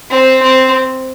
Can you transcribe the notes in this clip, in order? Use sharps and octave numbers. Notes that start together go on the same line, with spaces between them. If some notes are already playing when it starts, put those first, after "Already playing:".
C4
C4